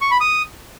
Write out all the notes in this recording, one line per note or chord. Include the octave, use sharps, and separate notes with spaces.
C#6
B5
D#6